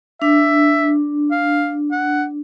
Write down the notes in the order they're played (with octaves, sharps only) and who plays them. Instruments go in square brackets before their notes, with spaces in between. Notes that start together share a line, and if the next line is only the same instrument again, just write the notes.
[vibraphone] D4 [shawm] E5
[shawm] F5
F#5